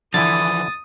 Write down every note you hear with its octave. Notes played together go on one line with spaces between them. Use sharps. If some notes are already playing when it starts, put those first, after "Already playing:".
D3 E3 F3 E4 G#5 D#6 A6